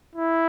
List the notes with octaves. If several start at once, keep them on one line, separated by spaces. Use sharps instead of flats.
E4